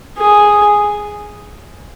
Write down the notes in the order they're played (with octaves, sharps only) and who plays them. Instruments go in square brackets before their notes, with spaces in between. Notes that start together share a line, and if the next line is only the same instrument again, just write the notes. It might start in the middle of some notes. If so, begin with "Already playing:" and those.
[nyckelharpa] G#4